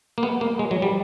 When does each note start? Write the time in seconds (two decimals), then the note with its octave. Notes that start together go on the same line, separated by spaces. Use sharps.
0.18 A#3
0.23 B3
0.41 A#3
0.59 G#3
0.71 F#3
0.82 G3